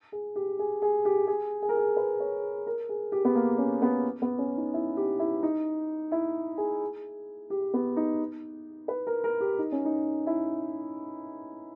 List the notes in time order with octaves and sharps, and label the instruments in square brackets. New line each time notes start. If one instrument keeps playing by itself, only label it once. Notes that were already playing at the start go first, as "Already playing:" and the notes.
[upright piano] G#4
G4
G#4
G#4
G4
G#4
G#4
A#4
G#4
B4
C#5
A#4
G#4
G4
B3
A#3
C#4
B3
B3
C#4
D#4
E4
G4
E4
D#4
E4
G#4
G4
B3
D#4
B4
A#4
A#4
G4
D#4
C#4
D#4
E4